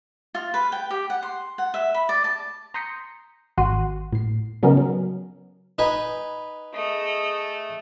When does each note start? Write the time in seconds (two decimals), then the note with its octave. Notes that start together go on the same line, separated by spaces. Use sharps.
0.35 F4
0.54 B4
0.72 G5
0.90 G4
1.10 F#5
1.23 C6
1.58 F#5
1.74 E5
1.94 B5
2.09 D5
2.24 A5
2.74 A#5 C6 D#6 G6 B6 C#7
3.58 G#1 F#4 F#5 C6 D#7
4.13 A2 C7
4.63 C#3 F#3 B3 C#4 D#4 A#4
4.77 F#3
5.78 D#4 B4 G#5
6.74 A3 G#4 D#5